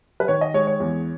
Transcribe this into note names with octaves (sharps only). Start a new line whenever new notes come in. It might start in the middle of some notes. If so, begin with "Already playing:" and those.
B4
D#3 C#5
D#5
G#3 C#5
C#5
E2